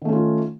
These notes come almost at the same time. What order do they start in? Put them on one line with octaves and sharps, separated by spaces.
D#3 A3 C#4 F4